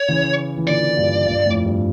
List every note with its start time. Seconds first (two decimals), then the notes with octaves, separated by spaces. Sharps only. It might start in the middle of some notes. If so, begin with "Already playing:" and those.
Already playing: C#5
0.08 C#3 E3
0.57 E3
0.67 A#2 D3 D5
0.97 G2 A#2
1.27 G2 A#2
1.45 F2 A2
1.65 G2